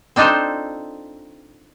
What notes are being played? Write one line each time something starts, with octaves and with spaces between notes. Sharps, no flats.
C4 D4 D#4 F4 A4 C5